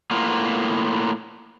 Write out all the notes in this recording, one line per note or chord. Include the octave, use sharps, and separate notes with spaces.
A2 A#3 B3 F4